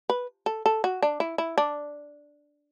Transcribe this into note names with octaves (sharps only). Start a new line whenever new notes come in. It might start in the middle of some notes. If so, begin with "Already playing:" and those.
B4
A4
A4
F#4
D4
E4
E4
D4